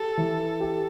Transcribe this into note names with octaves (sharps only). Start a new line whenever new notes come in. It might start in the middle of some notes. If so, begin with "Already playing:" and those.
Already playing: G4 A4
E3
G4